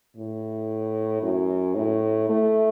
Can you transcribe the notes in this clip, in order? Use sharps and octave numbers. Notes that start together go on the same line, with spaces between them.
A2
F#2
A2
A3